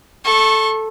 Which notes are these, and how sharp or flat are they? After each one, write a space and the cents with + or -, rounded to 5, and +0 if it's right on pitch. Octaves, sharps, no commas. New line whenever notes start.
A4 +0 C#6 -30